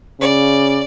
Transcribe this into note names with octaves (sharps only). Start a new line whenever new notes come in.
C#3 D5